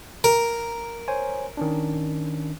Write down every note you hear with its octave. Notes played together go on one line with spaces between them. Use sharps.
A#4
C5 C#5 G#5
D#3 C#4 D4